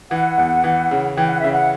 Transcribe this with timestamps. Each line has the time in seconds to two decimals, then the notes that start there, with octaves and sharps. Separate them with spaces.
0.11 E3 F#5
0.38 E2
0.64 E3
0.91 C#3
1.17 E3 G5
1.29 F#5
1.40 C#3 E5
1.52 F#5